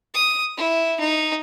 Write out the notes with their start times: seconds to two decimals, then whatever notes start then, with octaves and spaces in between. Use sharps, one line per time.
0.14 D#6
0.57 E4
1.00 D#4